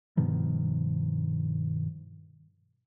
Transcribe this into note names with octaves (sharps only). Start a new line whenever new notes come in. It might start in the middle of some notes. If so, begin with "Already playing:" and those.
G2 B2 D#3 F3